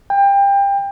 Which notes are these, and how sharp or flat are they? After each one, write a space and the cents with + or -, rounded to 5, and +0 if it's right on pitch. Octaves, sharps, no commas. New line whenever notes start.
G5 +25